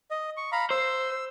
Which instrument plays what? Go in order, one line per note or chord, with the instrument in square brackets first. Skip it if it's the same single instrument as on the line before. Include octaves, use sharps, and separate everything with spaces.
[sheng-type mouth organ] D#5
C#6
F5 A#5 B5
[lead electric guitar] C5 [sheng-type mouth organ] E6